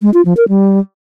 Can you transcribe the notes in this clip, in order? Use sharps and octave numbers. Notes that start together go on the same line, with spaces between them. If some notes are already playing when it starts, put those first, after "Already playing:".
G#3
F4
F3
A#4
G3